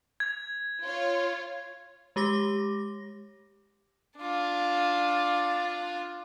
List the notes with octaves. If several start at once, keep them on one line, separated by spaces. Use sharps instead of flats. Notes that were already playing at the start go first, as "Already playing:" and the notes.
G#6
F4 C#5
G#3 G4 D6 A#6
D4 F4